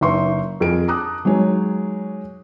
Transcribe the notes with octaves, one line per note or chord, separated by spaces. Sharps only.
F#1 D#4 B4 E5 C6 C#6
F2 G#4 A#4 D7
A5 A#5 D6 D#6 F#6
F#3 G#3 D#4 C#5